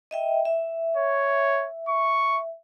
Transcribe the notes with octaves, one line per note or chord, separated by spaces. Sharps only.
D#5 E5 G5
E5
C#5
C#6